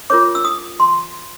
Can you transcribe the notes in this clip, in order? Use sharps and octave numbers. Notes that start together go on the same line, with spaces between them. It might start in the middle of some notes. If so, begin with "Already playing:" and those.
F4 A#4 C#5 D6
E6
D#6
C6